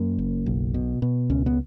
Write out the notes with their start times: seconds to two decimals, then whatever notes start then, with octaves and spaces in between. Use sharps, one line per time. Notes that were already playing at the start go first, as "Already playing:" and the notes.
Already playing: F#2 A#3
0.19 F#1
0.46 B1
0.74 B2
1.02 B2
1.30 C#2 C#4
1.46 B3